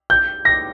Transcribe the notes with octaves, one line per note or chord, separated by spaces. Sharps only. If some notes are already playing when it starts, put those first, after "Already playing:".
G6
A#6